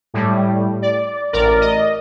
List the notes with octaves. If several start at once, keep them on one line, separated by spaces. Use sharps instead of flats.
A2 G3
D5
A1 A#4 D5
D#5